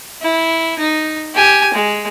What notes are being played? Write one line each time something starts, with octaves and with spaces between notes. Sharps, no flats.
E4
D#4
G4 G#5
G#3